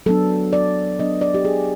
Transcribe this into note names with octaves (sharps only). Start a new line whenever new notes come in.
F#3 B3 D4 A4
D5
F#3 B3 D4 D#5
D5
G4
G#4